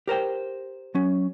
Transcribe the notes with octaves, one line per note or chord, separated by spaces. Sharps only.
G4 A#4 C5 G5
F#3 C#4